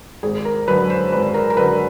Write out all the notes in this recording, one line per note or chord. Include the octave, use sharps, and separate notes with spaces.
G#1 G#4
A#4
F#2 D3 F#3 B4
C5
G#1 B4
A#4
A#4
F#2 D3 F#3 B4